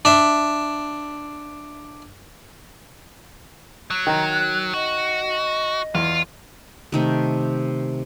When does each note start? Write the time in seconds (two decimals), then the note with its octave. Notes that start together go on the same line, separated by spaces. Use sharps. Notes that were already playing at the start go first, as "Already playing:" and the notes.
0.05 D4 E5
3.90 F#3
4.07 D#3 A#5
4.31 F#6
4.74 F#4 D#5
5.95 E2 F4
6.92 C3 D#3 A3